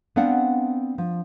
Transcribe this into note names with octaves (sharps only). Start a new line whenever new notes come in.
B3 C4 D4 F5 F#5
F3